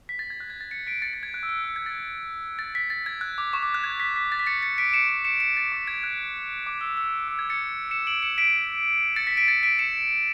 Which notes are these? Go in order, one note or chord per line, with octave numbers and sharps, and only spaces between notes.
B6
A6
G#6
F#6
G#6
A6
A6 C#7
B6 D7
A6 C#7
A6
G#6
F#6
E6
F#6
E6
G#6
A6
A6
B6
A6
G#6
F#6
D6
C#6
D6
F#6
G#6
B6
B6
A6
B6
A6 C#7
A6 C#7
B6 D7
D7
C#7 E7
C#7 E7
C#7 E7
C#7 E7
A6 C#7
D6
G#6
F#6
D6
E6
E6
E6
G#6
A6 C#7
C#7 E7
D7 F#7
C#7 E7
B6 D7
A6 C#7
B6
B6 D7
A6 C#7
B6 D7
C#7 E7